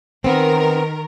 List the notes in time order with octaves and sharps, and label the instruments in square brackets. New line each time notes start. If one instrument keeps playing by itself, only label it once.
[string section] D#3 A#4 [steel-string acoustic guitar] B3 C4